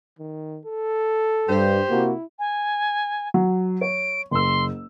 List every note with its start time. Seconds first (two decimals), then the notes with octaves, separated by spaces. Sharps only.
0.19 D#3
0.65 A4
1.49 G2 G4 C5
1.90 C3 A#3 E4 F#4
2.39 G#5
3.34 F#3
3.81 C#5 D7
4.31 F#1 C6 E6